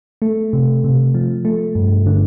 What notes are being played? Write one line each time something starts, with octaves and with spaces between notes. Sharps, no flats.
A3
C3
C3
F3
A3
G2
D3